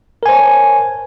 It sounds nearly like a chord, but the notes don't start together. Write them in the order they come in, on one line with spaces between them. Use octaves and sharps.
A#4 G#5 C5 C#5 A5